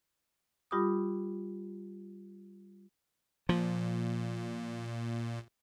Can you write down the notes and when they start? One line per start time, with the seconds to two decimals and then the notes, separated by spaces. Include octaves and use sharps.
0.71 G3 F4 G4 B5 D6 D#6
3.49 A#2 F3